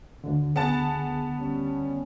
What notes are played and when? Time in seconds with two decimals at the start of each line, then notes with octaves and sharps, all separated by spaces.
0.24 D2 D3
0.56 B3 G#4 F#5 A5
1.38 G3 C#4